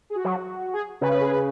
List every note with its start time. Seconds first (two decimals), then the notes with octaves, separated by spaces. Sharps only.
0.10 G#4
0.15 F#4
0.25 F#3
0.73 G#4
1.01 C#3 B4
1.11 B4
1.20 G#4
1.31 B4